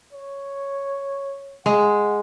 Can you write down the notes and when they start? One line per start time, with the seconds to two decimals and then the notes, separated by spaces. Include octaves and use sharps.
0.13 C#5
1.66 G#3 F#5